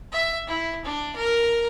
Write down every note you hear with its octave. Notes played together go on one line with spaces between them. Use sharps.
E5
E4
D4
A#4